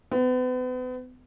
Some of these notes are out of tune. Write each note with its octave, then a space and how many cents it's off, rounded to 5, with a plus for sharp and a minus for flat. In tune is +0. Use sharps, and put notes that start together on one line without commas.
B3 +40